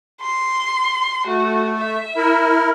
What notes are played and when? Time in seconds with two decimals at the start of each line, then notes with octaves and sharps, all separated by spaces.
0.22 C6
1.26 A3 F#4
1.78 E5
2.16 E4 A#4